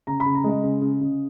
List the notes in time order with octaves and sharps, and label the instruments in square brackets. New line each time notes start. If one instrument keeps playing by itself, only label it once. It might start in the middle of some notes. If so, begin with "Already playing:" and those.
[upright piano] C#3 A#5
B5
C#3
A#5
G#3 D#5
C#3
C#3
C#3